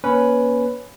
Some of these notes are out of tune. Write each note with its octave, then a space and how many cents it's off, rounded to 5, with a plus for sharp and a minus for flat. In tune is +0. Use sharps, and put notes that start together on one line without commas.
A#3 +30 C#4 +10 B4 +0